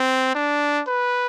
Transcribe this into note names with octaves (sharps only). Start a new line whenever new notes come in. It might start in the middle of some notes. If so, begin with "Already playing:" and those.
Already playing: C4
D4
B4